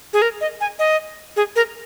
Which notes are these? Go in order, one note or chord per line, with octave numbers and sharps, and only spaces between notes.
G#4
A#4
D#5
G#5
D#5
G#4
A#4